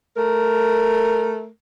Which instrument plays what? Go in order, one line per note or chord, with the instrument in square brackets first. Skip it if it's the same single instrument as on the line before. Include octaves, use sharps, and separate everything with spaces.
[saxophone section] A3 A#4